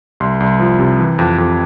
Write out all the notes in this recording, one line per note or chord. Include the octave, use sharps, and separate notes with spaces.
C2 C6
C2
F3
C3
E3
F2
F2